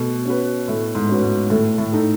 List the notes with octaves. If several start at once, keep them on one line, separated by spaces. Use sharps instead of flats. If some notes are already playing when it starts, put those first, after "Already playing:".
Already playing: B2 A3
C#4 F#4 B4
A2 A3
G#2
C#4 F#4 B4
G#2
A2 A3
A2
D#4 A4